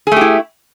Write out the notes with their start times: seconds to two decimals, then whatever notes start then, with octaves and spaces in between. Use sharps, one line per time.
0.07 G#4
0.12 A3
0.16 G4
0.21 E4